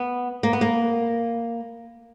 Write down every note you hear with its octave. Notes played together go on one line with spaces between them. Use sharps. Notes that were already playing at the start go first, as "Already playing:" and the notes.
Already playing: B3
A#3
B3
A#3